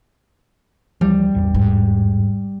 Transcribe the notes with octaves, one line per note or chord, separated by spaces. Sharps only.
D2 E3 F3 G3
A1 E2 G2
G#2